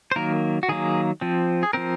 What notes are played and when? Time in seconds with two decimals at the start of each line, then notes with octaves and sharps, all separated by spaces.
0.12 C5
0.16 D#3 F#3 A#3 A#4
0.63 F#4
0.69 D#3 F#3 A#3 G#4
1.21 F3 C4
1.63 G#4
1.73 F3 C4 A#4